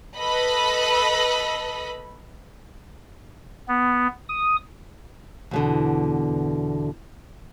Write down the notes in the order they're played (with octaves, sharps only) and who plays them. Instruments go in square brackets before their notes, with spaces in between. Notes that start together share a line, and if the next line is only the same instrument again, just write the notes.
[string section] A4 B4 D#5 B5
[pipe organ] B3
D#6
[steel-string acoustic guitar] E2 B2 D3